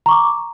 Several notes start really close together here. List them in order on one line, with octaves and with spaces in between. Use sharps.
A#5 C#6 D6